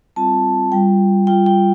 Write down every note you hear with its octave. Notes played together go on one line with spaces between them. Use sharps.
G3 C4 F4 A5
G3 F4 G5
G3 F4 G5
G5